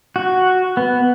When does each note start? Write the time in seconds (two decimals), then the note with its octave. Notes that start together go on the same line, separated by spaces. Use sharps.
0.16 F#4
0.77 B3